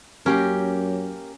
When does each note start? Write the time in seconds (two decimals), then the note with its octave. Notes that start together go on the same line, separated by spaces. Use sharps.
0.26 F#2 A#3 C#4 G4 A#4